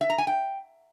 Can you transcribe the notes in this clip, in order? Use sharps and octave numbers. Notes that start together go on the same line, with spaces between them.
E5
A#5
G#5
G5